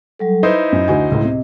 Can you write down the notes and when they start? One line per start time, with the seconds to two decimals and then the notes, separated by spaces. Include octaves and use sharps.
0.19 F#3 G3 A4
0.43 D#4 E4 B4 C5 D#5
0.72 F#2
0.88 D2 F#4 G#5
1.12 C#2 A2
1.25 C3